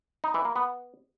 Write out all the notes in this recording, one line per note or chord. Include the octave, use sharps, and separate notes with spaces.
D#4
E3
A#3
B3